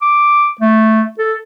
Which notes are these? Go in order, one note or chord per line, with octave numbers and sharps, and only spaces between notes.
D6
A3
A4